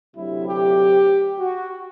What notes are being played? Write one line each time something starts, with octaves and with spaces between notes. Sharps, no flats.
D2 C3 F#3 E4
G4
F#4